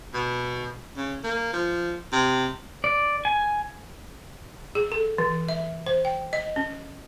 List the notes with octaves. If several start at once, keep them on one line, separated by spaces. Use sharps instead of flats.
B2
C#3
A#3
F3
C3
D5
G#5
G#4
A4
E3
E5
C5
G5
D#5
C#4